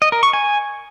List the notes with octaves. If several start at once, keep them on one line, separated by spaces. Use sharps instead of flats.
D#5
A#4
C#6
G#5